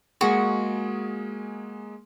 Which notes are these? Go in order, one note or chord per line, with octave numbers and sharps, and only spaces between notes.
G#3 A#3 F#4 G#4